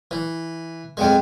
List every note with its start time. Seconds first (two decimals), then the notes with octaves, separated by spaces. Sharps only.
0.11 E3
0.97 F2 G#3 B4 F#5 G5